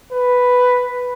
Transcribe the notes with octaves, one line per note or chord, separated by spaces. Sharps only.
B4